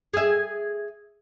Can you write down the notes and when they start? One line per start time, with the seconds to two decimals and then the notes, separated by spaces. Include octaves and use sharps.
0.13 G#4 E5